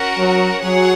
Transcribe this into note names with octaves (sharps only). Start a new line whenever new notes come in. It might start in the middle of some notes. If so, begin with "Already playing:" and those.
Already playing: C#4 F#4 A#4 F#5
F#3
F#3 G#4 C#5 F#5